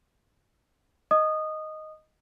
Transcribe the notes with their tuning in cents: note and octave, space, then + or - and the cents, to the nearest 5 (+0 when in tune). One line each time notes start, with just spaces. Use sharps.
D#5 +0 D#6 -15